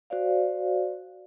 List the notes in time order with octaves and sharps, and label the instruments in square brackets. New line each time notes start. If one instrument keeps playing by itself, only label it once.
[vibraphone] F#4 C5 D5 F5